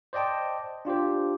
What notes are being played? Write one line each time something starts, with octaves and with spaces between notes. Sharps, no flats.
C5 D5 D#5 G5 A5
D4 F4 G4 C5